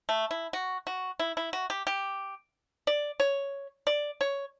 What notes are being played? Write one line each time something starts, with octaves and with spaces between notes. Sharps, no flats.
A3
E4
F#4
F#4
E4
E4
F#4
G4
G4
D5
C#5
D5
C#5